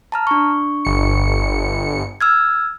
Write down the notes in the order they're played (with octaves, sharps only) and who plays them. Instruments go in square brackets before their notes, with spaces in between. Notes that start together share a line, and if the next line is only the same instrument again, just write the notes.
[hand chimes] A5 A#5 F6
D4 C#6
[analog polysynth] G1 C#7
[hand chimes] E6 F6 G#6